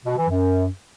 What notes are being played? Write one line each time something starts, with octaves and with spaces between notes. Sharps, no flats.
B2
E3
F#2